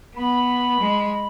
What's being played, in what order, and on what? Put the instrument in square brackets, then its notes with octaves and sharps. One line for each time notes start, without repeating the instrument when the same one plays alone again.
[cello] B3 [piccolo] B5
[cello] G#3